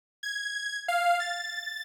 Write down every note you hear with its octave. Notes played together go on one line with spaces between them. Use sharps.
G#6
F5
A6